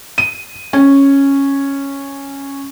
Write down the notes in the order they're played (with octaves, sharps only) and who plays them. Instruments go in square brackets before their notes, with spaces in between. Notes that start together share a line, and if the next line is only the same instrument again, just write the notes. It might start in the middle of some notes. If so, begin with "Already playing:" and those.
[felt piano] D#7
C#4